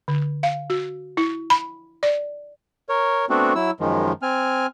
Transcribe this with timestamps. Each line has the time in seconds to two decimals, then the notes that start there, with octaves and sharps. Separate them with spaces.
0.08 D3
0.43 F5
0.70 F#4
1.17 E4
1.50 B5
2.03 D5
2.89 A#4 C#5
3.30 A3 B3 C4 D4 F#4
3.55 F#3 E4 E6
3.80 F#2 D#3 F3 G#3
4.22 C4 G#5 F6